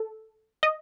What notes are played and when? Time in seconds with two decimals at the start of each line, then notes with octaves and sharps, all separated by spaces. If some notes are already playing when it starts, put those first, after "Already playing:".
Already playing: A4
0.63 D#5